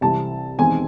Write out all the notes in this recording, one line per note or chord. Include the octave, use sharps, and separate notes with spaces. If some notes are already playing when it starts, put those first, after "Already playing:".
C2 C3 E3 C4 A5
E1 E2 D#3 G#3 C4 G#5